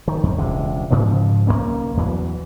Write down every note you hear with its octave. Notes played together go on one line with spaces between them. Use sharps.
D#3
F2
E1 C#2 C3 G#3
G#2 C#3 F3 G#3
B1 G#2 A#3 C#4
E2 E3 F#3